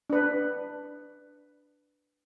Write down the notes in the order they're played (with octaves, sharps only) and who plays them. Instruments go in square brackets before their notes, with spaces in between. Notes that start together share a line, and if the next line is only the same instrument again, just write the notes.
[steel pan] D4 B4